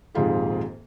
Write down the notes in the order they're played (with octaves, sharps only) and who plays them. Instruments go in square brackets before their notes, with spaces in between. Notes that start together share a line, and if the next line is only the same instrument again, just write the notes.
[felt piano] D#1 F2 G#2 G#3 F4 G4